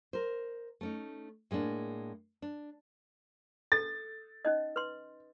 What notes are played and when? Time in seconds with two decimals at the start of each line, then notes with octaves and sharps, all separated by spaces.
0.13 A#4 C5
0.81 A3 C#4 D#4
1.51 A2 G#3 A#3 D4
2.42 D4
3.72 A4 A6
4.45 C#4 D#4 D#5
4.76 B4 C6